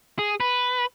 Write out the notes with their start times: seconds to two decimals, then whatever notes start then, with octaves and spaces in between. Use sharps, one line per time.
0.19 G#4
0.40 B4